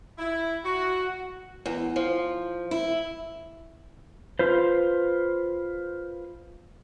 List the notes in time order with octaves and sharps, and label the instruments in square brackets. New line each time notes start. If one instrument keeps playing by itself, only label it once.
[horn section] E4
F#4
[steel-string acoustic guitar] E2
F3
E4
[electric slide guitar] F4 B4 C5